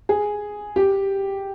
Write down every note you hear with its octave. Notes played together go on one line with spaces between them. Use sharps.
G#4
G4